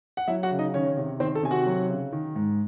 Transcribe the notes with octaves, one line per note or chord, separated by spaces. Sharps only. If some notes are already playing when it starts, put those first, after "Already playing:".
F#5
F#3 E4 E5
F#4 F#5
C#3
D#4 D#5
D#3 C#4 C#5
C3
D#3 C4 C5
A4
C3 G#5
F#4 F#5
F#3
C#3
D#3
G#2